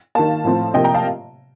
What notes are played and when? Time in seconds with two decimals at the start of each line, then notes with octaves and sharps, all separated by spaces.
0.15 D#3 A#3 F5 A5
0.44 A2 F3 C4
0.74 C3 F3 A#3 D#5 G5
0.84 G5 A#5
0.94 F5 A5